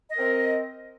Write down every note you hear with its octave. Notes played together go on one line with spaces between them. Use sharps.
C4 A#4 D#5